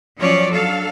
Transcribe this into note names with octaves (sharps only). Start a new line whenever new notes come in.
F3 F#3 C#4 C#5 D5
F#3 D4 A4 F5